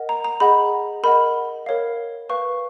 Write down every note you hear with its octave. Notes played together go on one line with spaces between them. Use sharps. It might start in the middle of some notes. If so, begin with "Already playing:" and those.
Already playing: A#4 D#5 F#5
A#5
A#5
G#4 D#5 F#5 B5
A#4 D#5 F#5 B5
A#4 C#5 F5
B4 F5 C#6